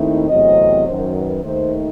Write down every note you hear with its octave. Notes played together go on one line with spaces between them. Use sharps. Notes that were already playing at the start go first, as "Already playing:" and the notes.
Already playing: D#2 D#3 A3 C4 D#4 E4
E2 C3 F#3 A3 C4 D#5
F#2 D#3 F#3 C5
B4
D#2 D#3 A3 D#4 C5